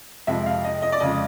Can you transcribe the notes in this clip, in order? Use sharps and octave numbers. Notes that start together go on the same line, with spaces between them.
F2 C3 F3 G#3 E5
F5
D#5
D#5
D5
F2 C#3 F3 G#3 D#5